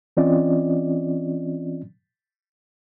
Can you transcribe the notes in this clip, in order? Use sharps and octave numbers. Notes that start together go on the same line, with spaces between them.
E3 C4 C#4 F4 D5 D#5